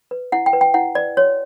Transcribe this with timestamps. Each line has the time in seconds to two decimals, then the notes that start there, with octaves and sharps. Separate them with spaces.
0.11 B4
0.32 E4 F#5
0.46 G5
0.53 B4
0.61 G5
0.74 E4 F#5
0.95 B4 D5
1.17 F#4 C#5